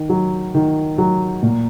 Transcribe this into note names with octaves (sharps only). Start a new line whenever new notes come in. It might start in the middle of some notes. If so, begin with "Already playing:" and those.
Already playing: D#3
F#3
D#3
F#3
A#2